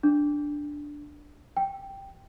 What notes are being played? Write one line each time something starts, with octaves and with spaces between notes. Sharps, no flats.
D4
G5